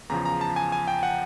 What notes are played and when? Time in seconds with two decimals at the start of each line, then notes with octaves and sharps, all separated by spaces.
0.10 E2 C#3 F3 A#5
0.25 A#5
0.41 A5
0.56 G#5
0.72 G#5
0.88 G5
1.03 F#5